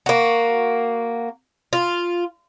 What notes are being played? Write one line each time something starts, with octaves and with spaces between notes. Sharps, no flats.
A#3 F#4
F4